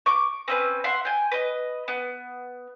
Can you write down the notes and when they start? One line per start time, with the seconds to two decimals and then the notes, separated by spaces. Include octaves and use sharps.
0.06 C#6 D6
0.48 C4 C#4 B4
0.84 E5 F#5 C6
1.05 G5 G#5
1.31 B4 D#5
1.88 B3